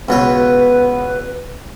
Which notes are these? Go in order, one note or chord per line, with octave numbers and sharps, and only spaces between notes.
C#2 B2 B3 B4 C#5